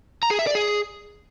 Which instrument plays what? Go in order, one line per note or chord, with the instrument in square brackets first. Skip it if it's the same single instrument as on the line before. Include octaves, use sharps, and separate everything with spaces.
[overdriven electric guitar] A#5
G#4
E5
D5
G#4